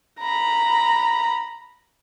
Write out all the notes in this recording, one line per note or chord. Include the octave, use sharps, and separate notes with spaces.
A#5 B5